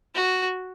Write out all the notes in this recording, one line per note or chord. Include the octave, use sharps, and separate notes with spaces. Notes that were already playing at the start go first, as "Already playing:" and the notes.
F#4